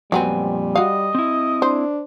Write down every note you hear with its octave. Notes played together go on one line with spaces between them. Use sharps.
F2 A#2 F#3 G3 B3 C4 G#5
F#4 D#5 F5
C4 E4
D4 C5